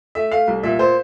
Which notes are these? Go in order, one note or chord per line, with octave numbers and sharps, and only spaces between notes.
A3 E5
A3 F5
C2
A#2 E5
A#2 C5